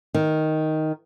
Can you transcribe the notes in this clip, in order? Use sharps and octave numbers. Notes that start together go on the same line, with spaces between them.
D#3